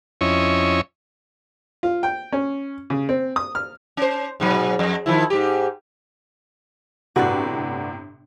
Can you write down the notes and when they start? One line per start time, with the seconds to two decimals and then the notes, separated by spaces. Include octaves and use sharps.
0.21 F2 C#4 E4 C#5 D#5
1.83 F4
2.03 G5
2.32 C#4
2.90 C#3
3.09 C4
3.36 D#6
3.55 F6
3.97 C#4 C5
4.40 G#2 B2 F#3
4.79 F2
5.06 D#3 F3 E4
5.30 G#2 G4
7.16 G1 A2 C3 F#4 B4 D5